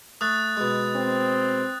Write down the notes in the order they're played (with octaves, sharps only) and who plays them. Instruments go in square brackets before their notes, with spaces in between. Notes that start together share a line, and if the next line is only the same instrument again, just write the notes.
[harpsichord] A3 E5 [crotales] D#6 F#6 A6
[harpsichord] B2 G#3
[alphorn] C4